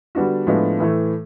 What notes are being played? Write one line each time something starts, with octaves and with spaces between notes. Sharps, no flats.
D3 G3 B3 D4 F#4
A2 F3 G#3 B3 D4
A2 E3 A3